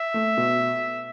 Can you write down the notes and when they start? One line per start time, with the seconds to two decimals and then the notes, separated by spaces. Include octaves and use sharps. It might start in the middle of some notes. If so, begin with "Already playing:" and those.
Already playing: E5
0.14 A3
0.37 B2